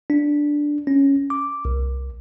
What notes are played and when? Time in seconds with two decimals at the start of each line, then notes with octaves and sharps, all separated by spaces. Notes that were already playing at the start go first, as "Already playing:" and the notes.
0.10 D4
0.87 C#4
1.30 D6
1.65 C2